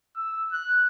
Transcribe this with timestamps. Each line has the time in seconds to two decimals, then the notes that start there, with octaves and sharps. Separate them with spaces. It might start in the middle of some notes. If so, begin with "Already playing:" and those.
0.16 E6
0.52 F#6